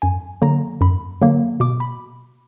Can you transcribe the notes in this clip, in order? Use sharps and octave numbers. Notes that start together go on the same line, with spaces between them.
F#2 G#5
D3 F#3 A#3 A#5
F#2 B5
D3 F#3 A#3
B2 D6
B5